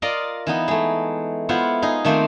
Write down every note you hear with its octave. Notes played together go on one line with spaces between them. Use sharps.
F4 A#4 D5 D#5 F5
E3 B3 D#4
G#3 A3
B3 E4 F4 C5 F#5
D#4 G#4 C6
D#3 A3 A#3 C4 C5